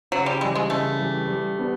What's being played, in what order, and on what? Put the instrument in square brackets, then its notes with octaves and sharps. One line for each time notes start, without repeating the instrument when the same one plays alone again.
[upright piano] C#3 [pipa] F#3
[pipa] G3
[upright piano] E3 G3 [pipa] G#3
[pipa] G#3
[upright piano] C#3 [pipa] A3
[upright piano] E3 G3
G3
B3 D4 G4